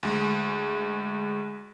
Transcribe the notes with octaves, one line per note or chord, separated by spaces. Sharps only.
D2 G#3